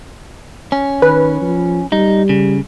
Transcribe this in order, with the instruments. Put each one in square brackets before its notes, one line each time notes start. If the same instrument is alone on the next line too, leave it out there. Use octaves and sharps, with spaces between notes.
[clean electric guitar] C#4
[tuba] D#3 [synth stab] B4
[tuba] F3
[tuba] G3 [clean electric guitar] D#4
[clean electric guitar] C#3